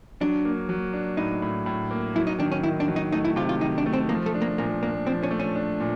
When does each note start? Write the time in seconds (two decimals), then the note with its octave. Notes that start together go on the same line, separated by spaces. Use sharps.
0.21 F#3 D4
0.45 A#3
0.69 F#3
0.93 D4
1.17 A2 D#4
1.42 A2
1.66 A2
1.91 A#3
2.15 F#3 E4
2.27 D#4
2.39 D#3 D4
2.52 C#4
2.63 D#3 E4
2.80 D4
2.88 F#3
2.96 D#4
3.12 A3 D#4
3.25 E4
3.36 C3 F4
3.49 F4
3.61 D#3 D#4
3.78 D4
3.86 A3
3.93 C4
4.09 F3 A#3
4.26 A3
4.34 D4
4.41 A#3
4.58 A#2 A#3
4.83 A#3 D4
5.06 F3 C4
5.23 C#4
5.31 A3
5.40 C#4
5.55 D4
5.80 A#2